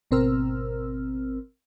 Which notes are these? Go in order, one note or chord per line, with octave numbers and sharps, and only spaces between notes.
G#1 B2 C4 A#4 E6 F6